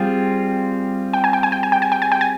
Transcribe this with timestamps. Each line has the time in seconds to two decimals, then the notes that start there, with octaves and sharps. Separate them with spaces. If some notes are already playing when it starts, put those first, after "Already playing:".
Already playing: G3 C4 F4 G#4
1.14 G5
1.24 G#5
1.33 G5
1.43 G#5
1.52 G5
1.63 G#5
1.72 G5
1.82 G#5
1.92 G5
2.02 G#5
2.12 G5
2.21 G#5